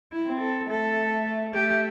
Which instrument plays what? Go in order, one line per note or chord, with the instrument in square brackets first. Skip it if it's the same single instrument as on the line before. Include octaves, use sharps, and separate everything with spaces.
[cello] E4
[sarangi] C4
[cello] A4
[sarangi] A3 [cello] A4
[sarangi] A3 [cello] G4